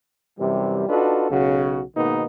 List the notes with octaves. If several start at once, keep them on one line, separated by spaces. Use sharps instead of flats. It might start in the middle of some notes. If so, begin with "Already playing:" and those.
F#2 C3 E3 G3
D4 D#4 F4 F#4 A4 B4
B1 C#3 F#4
G#2 B2 D#3 A#3 B3 D#4